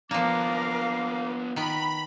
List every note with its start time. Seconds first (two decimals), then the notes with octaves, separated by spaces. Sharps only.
0.11 F3 A#3 B3 D4 A#4 F5 D6
1.56 D#3 B3 A#5 B5